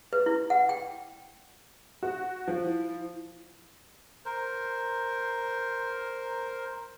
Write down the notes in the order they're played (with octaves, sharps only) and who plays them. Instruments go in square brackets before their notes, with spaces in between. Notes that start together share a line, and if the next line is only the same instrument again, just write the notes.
[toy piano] B4
E4
F#5
G5
[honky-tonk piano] F#4
F3
[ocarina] E4
[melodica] A#4 C5